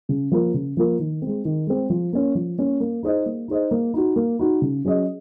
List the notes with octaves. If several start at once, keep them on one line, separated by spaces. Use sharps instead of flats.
C#3
F3 A#3 F4 A#4
C#3
F3 A#3 F4 A#4
D#3
G#3 C4
D#3
G#3 C4
F3
A#3 C#4
F3
A#3 C#4
A#3
D#4 G#4 C5 D#5
A#3
D#4 G#4 C5 D#5
A#3
D#4 F#4
A#3
D#4 F#4
C#3
F#3 C#4 G#4 D#5